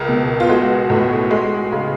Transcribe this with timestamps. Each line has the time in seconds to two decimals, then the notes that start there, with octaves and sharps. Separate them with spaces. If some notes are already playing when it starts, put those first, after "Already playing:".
Already playing: C#2 A#4
0.09 B2
0.40 F4
0.49 G#3 F#4
0.90 A2
1.31 G#3
1.72 C#3